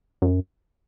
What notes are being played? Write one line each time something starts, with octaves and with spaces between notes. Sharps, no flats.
F#2